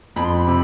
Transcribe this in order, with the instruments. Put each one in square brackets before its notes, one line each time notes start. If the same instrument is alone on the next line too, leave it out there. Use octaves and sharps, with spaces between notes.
[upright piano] F2 [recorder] B5
[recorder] C6
B5
[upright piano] C3